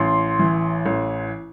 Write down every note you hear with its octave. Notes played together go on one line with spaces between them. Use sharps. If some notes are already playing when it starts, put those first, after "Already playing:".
Already playing: A1 C6
E3
A1